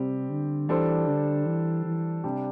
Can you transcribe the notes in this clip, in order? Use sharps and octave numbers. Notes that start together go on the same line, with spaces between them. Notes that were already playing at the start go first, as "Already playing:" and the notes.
Already playing: C3 G3 C4 G4
D3
E3 G3 D4 A4 C5
D3
E3
E3
C3 G3 D4 G4